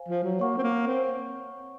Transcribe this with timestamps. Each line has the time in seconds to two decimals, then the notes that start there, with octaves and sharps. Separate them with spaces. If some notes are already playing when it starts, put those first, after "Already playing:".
Already playing: C5 F5 G#5
0.09 F3
0.24 F#3
0.39 A#3 C#5 F#5 C#6
0.58 C4
0.63 A#3
0.87 C4